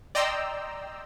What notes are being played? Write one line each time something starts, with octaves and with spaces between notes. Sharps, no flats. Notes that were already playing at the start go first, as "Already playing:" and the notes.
D5 D#5 G5 A#5 C6 E6